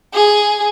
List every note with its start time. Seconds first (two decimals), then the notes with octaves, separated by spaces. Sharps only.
0.14 G#4